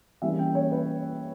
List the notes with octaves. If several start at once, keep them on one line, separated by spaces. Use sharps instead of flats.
E3 G3 A#3 C#4 E5
G5
C#5
B4